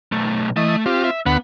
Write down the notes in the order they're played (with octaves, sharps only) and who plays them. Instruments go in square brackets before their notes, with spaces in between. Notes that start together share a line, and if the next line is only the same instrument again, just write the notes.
[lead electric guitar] B1 A3
[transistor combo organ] E3 D#5 [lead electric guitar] A3
[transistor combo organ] C4 F4 [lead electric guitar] G4
[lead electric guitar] E5
[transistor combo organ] D2 F#5 B5 [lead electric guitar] B3